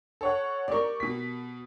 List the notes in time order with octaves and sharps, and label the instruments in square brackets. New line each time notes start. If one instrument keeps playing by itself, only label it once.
[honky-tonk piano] A4 C#5 F#5
[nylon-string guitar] G4 A#4 [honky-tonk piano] D5 C#6
[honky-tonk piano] B2 B6